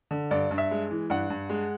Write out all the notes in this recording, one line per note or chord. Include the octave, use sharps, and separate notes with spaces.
D3
G2 D5
G2
E5
G#3
E3
G2 F#5
G2
G#3